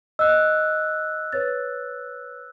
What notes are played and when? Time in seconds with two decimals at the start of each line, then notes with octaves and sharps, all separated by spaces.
0.19 D#5 E6 F#6
1.32 B4 C#5 A6